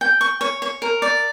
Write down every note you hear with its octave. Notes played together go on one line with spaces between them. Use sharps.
G5
C#6
C#5
C#5
A#4
D5